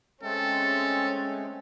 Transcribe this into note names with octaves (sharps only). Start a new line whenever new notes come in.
G#3 A3 C4 C#4 A4